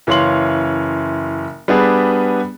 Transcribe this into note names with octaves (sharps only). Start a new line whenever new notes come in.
F#1 E3 C#4 F5 C6 F#7
G3 B3 D4 G#4 B4